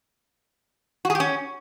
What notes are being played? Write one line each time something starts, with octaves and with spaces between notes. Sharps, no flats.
F#4
G#4
G4
C#4